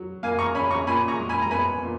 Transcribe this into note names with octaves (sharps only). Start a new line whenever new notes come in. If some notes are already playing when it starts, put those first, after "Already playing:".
Already playing: F#3
A#3 F5 G#5
A#5 C#6
C#4 G#5 B5
A#5 C#6
A#2 G#5 B5
A#5 C#6
G#3
G#5 B5
A#5
B3 G#5 B5
A#2